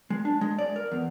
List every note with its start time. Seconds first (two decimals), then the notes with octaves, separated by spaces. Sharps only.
0.10 G#3
0.25 D4
0.41 G#3
0.59 D5
0.76 A#4
0.92 E2